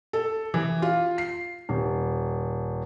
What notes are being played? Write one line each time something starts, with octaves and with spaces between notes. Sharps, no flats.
A4
E3
F4
C7
D#1